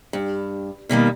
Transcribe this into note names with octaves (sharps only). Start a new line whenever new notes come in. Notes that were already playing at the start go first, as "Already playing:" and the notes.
G2
B2 D#3 G3 A#3